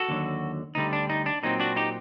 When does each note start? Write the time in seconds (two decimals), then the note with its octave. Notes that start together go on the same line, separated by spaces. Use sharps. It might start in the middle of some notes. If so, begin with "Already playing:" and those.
Already playing: F#4 A4
0.09 D#2 D3 F#3
0.75 D2 D3 G3 D#4
0.93 D4
1.10 D#4
1.26 D4
1.43 A#2 F#3 C4 D#4
1.60 D4 F#4
1.76 D#4 G4